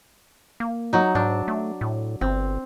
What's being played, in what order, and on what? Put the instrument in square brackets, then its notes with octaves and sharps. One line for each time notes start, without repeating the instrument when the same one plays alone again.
[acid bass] A#3
[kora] F#3 D#4
[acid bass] G#2 [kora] D4
[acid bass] A3
A2
[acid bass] G1 [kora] C4